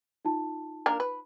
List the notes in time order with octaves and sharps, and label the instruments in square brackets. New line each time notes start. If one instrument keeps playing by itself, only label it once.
[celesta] D#4 F4 A5
[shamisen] A#3 D4 A#4
B4